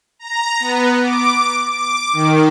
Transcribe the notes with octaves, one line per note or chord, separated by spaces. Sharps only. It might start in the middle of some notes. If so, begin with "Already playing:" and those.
A#5
B3
D6
D6
D#3